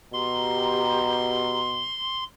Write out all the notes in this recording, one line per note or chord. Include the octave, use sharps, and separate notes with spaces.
B2 G4 A#5 C6